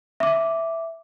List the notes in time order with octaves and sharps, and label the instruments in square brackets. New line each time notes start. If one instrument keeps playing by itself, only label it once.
[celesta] E5 D6